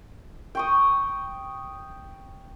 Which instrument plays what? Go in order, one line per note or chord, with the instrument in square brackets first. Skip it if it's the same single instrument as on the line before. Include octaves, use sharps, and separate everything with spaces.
[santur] G5 C#6 D#6